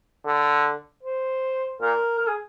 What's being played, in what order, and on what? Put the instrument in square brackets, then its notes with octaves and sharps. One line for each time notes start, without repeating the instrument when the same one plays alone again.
[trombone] D3
[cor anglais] C5
[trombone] A#2 [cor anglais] A#4
[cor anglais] A#4
G#4